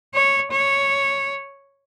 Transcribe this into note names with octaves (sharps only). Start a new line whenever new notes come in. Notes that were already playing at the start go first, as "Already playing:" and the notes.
C#5
C#5